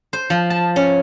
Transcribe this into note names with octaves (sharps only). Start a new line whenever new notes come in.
C5
F3
A5
C#4